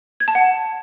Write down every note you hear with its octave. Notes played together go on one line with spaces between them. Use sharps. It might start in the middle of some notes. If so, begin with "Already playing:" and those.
G#6
A5
F#5